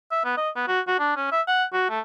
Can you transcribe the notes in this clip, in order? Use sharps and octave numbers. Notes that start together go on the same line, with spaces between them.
E5
B3
D#5
B3
F#4
F#4
D4
C#4
E5
F#5
F#4
A3